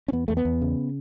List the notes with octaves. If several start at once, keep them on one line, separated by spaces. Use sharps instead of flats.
C#4
E2 B3
E2 A3
B3
E2
C#3